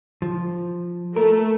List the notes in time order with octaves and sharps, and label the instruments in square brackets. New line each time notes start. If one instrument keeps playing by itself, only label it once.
[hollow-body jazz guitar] F3
[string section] A3 [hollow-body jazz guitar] A#4